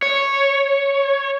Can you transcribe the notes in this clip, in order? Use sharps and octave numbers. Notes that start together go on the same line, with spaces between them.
C#5